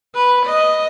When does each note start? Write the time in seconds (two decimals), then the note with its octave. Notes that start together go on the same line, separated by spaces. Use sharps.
0.15 B4
0.46 D#5